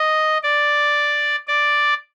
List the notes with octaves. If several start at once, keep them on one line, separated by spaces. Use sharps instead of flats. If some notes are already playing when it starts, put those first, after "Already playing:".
Already playing: D#5
D5
D5